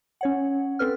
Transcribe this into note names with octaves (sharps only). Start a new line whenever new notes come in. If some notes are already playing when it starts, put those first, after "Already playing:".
C#4 C#5 F#5
C4 A4 B4 F6